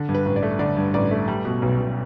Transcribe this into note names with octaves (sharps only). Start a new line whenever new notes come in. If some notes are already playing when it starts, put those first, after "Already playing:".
Already playing: D3
G2
B4
A1
D5
A3
D3 D5
G2
A1 D5
A3
G3
B2
B1
B1